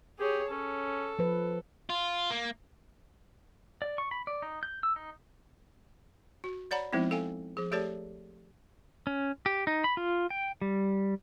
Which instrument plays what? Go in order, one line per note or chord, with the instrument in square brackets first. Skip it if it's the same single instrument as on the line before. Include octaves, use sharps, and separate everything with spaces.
[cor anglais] G4 [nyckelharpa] G#4 C#5
[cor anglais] C#4 [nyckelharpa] A4
[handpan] F3 B4
[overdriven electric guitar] F4
A#3
[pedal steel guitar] D5
C#6
B5
D5
D#4
G6
E6
D#4
[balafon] F#4
C#5 D5 F#5 A#5 B5
F3 G#3 B3 C4 D#4 E4
A4 F5 G5 G#5
F3 G#4
A3 G4 A4 C#5 D5 A5
[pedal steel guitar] C#4
G4
D#4
B5
F4
G5
G3